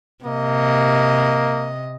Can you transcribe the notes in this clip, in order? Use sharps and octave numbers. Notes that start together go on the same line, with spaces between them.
C3 A#3 D#5